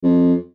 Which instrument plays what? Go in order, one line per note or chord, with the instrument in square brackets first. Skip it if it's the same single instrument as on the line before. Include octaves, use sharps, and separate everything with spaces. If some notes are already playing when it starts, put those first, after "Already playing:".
[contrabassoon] F2